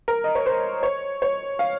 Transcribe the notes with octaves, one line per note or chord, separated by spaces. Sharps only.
A#4
D#5
C#5
C5
C#5
C#5
F5